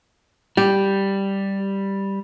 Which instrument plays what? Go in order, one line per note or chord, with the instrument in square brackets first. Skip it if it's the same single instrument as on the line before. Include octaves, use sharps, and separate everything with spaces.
[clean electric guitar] G3 [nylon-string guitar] G4